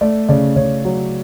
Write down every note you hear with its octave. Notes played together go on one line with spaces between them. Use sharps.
A3 D5
C#3 D5
C#3 C#5
F#3